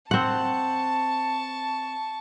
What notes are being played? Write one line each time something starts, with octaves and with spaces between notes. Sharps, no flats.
C4 F#5 A5 C#6